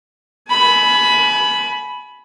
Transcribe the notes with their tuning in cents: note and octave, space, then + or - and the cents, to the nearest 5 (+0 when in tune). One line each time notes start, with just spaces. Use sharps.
G#5 +35 B5 +0